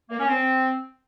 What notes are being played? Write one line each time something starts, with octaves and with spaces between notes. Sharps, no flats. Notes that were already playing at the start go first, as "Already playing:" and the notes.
A#3
C#4
C4